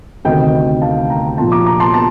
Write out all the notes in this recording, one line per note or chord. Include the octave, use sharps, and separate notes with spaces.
D2 C3 D#3 D#5 G5
F5 A5
G5 A#5
A#1 A#2 F3 A5 C6
A#5 D6
A#5 D6
A5 C6
A5 C6